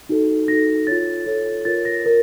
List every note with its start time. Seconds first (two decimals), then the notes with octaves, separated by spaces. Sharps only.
0.09 D#4 F#4 A4
0.48 D#4 F#4 A4 A#6
0.87 F4 A4 C#5 A6
1.26 F4 A4 C#5
1.65 F4 A#4 C#5 A6
1.85 A#6
2.04 F4 A#4